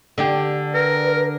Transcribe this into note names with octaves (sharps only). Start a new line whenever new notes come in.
D3 D4 G4
A#4 B4